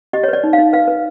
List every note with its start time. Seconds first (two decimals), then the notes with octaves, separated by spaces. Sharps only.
0.13 G4 D#5
0.24 C#5
0.28 B4 D5
0.44 D#4
0.53 F5
0.58 D#4
0.73 B4 F5
0.88 B4